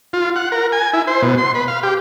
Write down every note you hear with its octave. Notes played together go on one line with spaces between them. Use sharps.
F4
F#5
A#4
G#5
E4
C5
B2
C6
B4
F5
G4